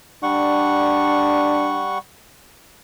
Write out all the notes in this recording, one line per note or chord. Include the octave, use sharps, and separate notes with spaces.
G3 D4 F#5 C#6